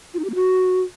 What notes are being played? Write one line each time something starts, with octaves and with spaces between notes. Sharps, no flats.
F4
D#4
G4
A#3
F#4